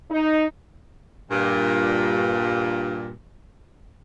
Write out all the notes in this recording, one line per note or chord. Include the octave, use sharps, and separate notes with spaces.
D#4
G2 A#2